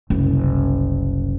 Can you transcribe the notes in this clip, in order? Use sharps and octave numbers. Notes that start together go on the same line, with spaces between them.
F#1 C2